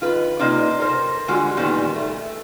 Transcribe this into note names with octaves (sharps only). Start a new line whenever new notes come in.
D#3 F4 B4
C3 A#3 D#4 F4 D5
A4 A#4 C5
D3 E3 G3 G#3 F4 F#4
A#2 D#3 G3 B3
A3